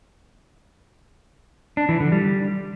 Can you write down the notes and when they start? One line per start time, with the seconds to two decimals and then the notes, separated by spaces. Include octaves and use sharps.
1.77 D4
1.89 E3
2.00 D3
2.12 G3